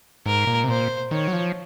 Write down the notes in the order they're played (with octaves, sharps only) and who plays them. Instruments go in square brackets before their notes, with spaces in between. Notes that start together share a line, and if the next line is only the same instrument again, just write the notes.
[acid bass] G#2 [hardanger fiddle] A#4
[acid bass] A#2
C3
[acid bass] A#2 [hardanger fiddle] C5
[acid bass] D#3 [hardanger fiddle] C#5
[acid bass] F#3
F3